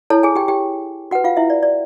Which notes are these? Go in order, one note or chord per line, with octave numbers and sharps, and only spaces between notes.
E4 A4 C#5 A5
G#4 G#5
G4 G5
G4 G5
F#4 B4 F#5
F4 F5
E4 E5
D5
D5